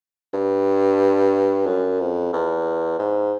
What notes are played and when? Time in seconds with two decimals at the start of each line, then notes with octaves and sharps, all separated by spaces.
0.34 G2
1.67 F#2
2.00 F2
2.33 E2
2.99 G#2